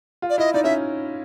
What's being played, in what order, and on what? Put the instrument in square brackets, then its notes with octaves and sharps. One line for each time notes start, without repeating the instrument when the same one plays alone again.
[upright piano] F4
[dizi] D5
[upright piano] E4 [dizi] D#5
[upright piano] D#4 [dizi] D5
[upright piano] C#4 [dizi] E5